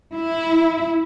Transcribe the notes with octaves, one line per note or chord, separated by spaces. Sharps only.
E4